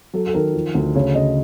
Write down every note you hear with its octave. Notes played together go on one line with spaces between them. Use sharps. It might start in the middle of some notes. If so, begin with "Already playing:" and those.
F#3 A4
A4
D#3 A#4
F3
D2
C#3 C#5
C#3 D#5